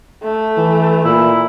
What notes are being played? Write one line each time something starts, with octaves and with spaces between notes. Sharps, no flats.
A3
E3
A#2 E4